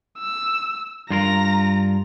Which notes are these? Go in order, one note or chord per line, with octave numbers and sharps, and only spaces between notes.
E6
G2 F4 A#4 A#5 A#6